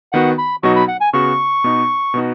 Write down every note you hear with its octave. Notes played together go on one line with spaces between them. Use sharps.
D#3 B3 F#4 F#5
B5
B2 F#3 B3 D#4 F#4 C#6
B5
F#5
G#5
C#3 B3 F#4 C#6
B2 B3 D#4
B2 B3 D#4 F#4